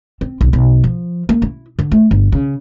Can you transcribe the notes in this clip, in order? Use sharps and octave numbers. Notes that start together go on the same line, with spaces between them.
C4
B1
B1
F3
A#3
E4
D3
A3
G1
C#3